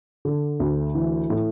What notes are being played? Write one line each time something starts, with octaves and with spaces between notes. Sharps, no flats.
D3
D2
E3
A2